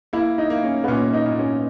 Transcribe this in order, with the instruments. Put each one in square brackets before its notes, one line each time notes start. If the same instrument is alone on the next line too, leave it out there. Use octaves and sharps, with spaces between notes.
[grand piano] A#3 [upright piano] E4
[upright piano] D#4
[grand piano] A#3
[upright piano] C#4
B3
[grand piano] A#2 [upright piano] C#4
[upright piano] D#4
[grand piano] A#2
[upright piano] C#4